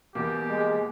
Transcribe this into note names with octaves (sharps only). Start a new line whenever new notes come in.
E2 B2 A#3 G4
G#3